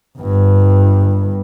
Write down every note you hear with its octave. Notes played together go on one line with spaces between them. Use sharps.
G1 G2